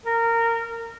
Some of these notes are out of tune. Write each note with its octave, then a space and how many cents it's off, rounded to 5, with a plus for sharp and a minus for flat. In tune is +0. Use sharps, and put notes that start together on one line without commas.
A#4 -15